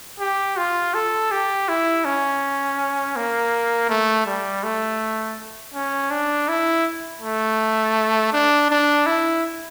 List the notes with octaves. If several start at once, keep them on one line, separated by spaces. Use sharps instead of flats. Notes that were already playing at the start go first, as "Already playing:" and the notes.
G4
F4
A4
G4
E4
C#4
A#3
A3
G3
A3
C#4
D4
E4
A3
D4
D4
E4